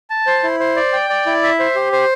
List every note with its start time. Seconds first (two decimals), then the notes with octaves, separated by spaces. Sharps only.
0.10 A5
0.27 C5
0.43 E4
0.60 C5
0.76 D5
0.93 G5
1.09 D5
1.26 E4
1.43 E5
1.60 C5
1.76 G4
1.92 C5